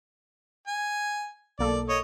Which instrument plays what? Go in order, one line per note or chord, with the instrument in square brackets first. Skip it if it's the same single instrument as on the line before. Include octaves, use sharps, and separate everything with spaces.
[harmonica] G#5
[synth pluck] B1 A#3 A4 [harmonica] D5
[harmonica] C#5 D#5